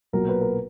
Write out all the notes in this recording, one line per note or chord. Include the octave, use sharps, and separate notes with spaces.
B1 A#2 F#3 A#4
B4
A#4